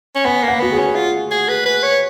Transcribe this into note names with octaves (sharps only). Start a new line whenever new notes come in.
C#4
B3 G#5
A#3
F#5
B3 F#4
G#4
C#4
F4
G#4
B4
B4
C#5